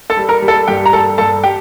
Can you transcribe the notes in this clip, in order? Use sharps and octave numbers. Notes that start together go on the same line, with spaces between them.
A4 A5
G3
A#4 A#5
G3
A4 A5
G2 G4 G5
A#5
G2 A4 A5
G2 A4 A5
G4 G5